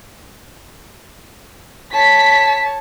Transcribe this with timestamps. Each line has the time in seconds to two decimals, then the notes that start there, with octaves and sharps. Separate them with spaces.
1.94 C#5 A5 B6